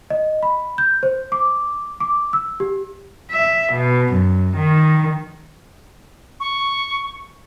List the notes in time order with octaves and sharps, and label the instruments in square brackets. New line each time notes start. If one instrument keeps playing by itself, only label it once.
[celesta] D#5
B5
G6
C5
D6
D6
E6
G4
[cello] E5
B2
F#2
D#3
[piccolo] C#6